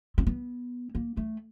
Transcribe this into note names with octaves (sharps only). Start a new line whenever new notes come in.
C4
B3
A#3
A3